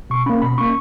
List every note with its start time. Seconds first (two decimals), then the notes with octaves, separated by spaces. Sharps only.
0.10 B2 C#6
0.26 A#3 C#4 B5
0.42 B2 B5
0.58 A#3 C#4 C#6